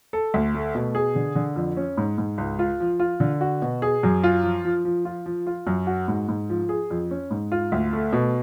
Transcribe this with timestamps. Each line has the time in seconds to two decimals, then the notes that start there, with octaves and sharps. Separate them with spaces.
0.13 A4
0.34 D2
0.55 A3
0.75 B2
0.95 G#4
1.15 D3
1.35 D3
1.56 F2
1.77 C#4
1.97 G#2
2.18 G#2
2.38 C#2
2.59 F4
2.80 F3
3.00 F4
3.20 D3
3.41 F#4
3.62 B2
3.82 G#4
4.03 F#2
4.23 F4
4.43 F3
4.65 F3
4.85 F3
5.05 F4
5.26 F3
5.47 F4
5.67 F#2
5.87 F#4
6.08 G#2
6.28 G#2
6.49 F3
6.69 G#4
6.91 F2
7.11 C#4
7.31 G#2
7.52 F4
7.72 D2
7.93 A3
8.13 B2